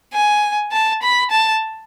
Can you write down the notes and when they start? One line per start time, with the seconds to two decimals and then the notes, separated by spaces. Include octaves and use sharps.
0.13 G#5
0.72 A5
1.03 B5
1.31 A5